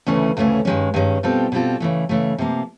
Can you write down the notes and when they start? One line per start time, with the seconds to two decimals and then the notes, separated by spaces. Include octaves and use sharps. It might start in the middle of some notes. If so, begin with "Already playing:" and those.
0.07 D2 C#3 E3 A3 C#4
0.37 D2 C#3 E3 A3 C#4
0.65 G2 D#3 G#3 C#4
0.94 G2 D#3 G#3 C#4
1.23 B2 G3 C4 F4 A4
1.52 B2 G3 C4 F4 A4
1.80 C#3 E3 A3
2.09 C#3 E3 A3
2.38 C3 F3 A#3